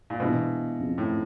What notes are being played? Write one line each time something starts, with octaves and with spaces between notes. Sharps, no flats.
A#2
B2 E3 G#3 B3 D4
F2 C#3 F3
A2